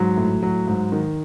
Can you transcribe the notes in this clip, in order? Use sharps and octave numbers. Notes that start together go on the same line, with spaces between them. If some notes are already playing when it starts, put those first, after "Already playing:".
Already playing: G#2 F#3
A2
F#3
G#2
D#3